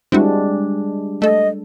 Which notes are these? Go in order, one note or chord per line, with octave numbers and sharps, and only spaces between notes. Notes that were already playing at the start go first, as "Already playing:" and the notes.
G3 G#3 C4 D4 E4 F#4
A3 A4 D#5